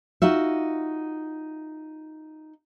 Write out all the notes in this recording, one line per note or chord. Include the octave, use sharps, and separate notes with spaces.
D#4 F4 F#4 E5